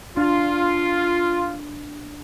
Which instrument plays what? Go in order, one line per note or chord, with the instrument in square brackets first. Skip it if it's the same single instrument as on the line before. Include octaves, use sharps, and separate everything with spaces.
[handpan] D4 [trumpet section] F4